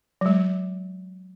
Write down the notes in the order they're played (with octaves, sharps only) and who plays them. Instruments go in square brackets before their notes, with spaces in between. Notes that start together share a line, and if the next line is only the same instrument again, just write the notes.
[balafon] F#3 G#3